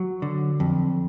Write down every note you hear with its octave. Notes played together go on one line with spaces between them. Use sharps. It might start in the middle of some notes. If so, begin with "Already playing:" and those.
Already playing: F#3
D3
F2